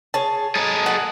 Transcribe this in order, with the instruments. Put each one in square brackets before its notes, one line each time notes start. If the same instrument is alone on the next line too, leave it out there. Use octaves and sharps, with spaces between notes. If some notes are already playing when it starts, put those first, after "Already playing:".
[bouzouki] G#4 C#5 [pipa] A5
[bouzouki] D#4 [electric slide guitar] G#4 A4 D#5
[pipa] F#5